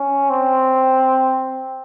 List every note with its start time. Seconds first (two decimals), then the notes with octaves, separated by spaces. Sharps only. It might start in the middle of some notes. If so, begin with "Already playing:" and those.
Already playing: C#4
0.30 C4